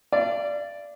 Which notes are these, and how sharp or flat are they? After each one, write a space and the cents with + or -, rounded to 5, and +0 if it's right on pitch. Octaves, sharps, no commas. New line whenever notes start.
D5 +0 F5 -40